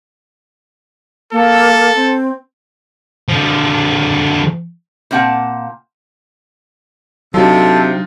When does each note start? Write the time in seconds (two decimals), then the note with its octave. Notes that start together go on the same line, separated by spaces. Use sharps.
1.32 A#3 A4
1.95 C4
3.29 D3 F3
5.11 A#2 A#3 C4 F#5 A5
7.34 C3 F#3 D4 D#4 F4 A4